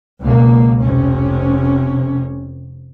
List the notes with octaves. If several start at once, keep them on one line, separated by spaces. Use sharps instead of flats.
C#2 B2 A#3
F1 C3 C#4